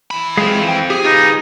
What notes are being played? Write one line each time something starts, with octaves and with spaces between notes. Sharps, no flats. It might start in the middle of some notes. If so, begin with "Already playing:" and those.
E3 B5
G#3 C4 F4 G#4 F5
G5
G4 G#4
D#4 F4 B4